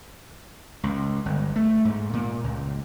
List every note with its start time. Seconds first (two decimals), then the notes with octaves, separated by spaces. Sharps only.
0.83 C#2
1.26 G1
1.56 A3
1.85 G#2
2.13 A#2
2.44 C#2